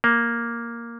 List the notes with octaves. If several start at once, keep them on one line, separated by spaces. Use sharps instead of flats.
A#3